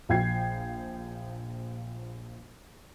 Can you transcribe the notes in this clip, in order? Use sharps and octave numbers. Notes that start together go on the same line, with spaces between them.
A#1 F3 G5 G#6 C7